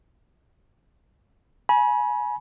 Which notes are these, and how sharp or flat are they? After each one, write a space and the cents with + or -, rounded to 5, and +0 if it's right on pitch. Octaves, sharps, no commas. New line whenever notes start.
G#5 +25 B5 -35